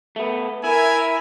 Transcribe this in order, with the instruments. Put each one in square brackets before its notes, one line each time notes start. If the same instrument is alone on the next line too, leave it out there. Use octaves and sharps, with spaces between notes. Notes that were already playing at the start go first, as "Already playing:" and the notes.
[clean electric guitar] A3 B3
[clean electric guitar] E4 [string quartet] A#4 E5 [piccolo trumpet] G#5